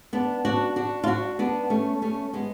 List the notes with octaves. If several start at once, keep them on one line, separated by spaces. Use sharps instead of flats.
B3 D4
D4 F#4
D4 F#4
F4
D4 F#4
B3 D4
A3 C#4
A3 C#4
G#3 B3